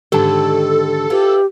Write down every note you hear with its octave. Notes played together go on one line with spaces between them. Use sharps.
G#2 D3 D#3 G4 A4 A5
E4 F4 G4 B4